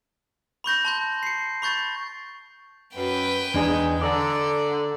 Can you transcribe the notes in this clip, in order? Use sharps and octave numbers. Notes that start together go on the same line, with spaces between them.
B5 C#6 G6 A#6
A5 C6 G6
C7 C#7
B5 C#6 G6 A6
F#2 B4 G5
E2 G#3 D4 D#4 G#5
D3 D5 A5 A#5 D6